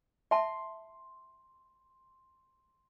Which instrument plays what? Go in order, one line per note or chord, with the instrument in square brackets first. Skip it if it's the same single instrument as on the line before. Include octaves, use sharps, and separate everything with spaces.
[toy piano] E5 A5 [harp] C6